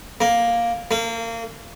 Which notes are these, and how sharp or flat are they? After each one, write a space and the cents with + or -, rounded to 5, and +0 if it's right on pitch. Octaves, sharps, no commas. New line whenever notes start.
A#3 +5
A#3 -30